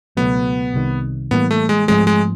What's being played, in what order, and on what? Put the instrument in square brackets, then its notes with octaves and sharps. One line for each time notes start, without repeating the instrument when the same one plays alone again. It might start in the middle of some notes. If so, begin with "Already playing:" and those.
[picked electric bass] C#2 B2 F#3 A3 [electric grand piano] B3
[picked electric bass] C2 C3 D#3
[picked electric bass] A2 E3 G3 A#3 [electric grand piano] B3
[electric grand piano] A3
G#3
[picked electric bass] G#2 F3 A3 C4 [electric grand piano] G#3
[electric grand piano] G#3